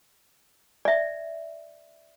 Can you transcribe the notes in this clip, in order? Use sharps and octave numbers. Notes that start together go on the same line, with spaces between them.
D5 E5